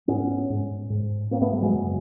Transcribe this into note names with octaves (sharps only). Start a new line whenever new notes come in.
G#2 B3 C#4
G#2
G#2
G#2 A#3 C4
A3 B3
G3 A3
F#3 G#3
F#2 C#3